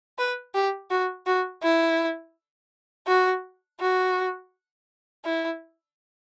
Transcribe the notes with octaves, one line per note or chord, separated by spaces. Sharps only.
B4
G4
F#4
F#4
E4
F#4
F#4
E4